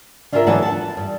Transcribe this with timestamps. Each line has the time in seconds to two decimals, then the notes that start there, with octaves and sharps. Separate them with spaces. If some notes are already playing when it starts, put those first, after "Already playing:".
0.32 D4 F4 F#4 G#4 A#4 E5
0.47 D3 E3 F#3 B3 F#5 A5
0.62 F#5 A5
0.97 G2